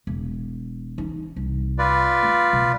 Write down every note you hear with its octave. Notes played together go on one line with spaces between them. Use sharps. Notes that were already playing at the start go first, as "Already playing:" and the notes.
E1
E3 D#4
C2
F4 B4 D5
A3
B2